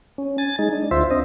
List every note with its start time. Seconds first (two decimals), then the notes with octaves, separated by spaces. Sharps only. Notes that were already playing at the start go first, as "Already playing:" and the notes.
0.18 C#4
0.38 G#5 A6
0.59 G#3 D#4
0.72 D4
0.91 D2 F4 C5 E5
1.11 C4 D4 D#5